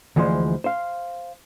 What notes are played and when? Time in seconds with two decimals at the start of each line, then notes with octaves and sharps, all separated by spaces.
0.16 D2 E3 F3 G#3 C5
0.64 C5 F5